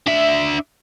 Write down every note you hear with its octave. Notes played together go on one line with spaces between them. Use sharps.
D4 E5